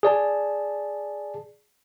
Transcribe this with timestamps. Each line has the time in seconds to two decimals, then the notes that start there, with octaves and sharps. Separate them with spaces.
0.03 G#4 D5 A5